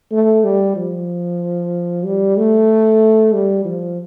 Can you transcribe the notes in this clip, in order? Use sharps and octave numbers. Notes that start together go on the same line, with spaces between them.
A3
G3
F3
G3
A3
G3
F3